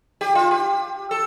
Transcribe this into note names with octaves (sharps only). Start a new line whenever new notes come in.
G4
F4
G4
A4